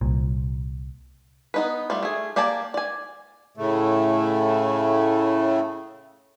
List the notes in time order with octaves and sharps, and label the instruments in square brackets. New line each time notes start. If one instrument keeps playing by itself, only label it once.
[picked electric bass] C2 A#2
[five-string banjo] B3 D#4 B4
G3 A3 F4
A3 G#4
A#3 G4 D5 G#5 A5
D5 G#5
[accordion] A2 C#3 A3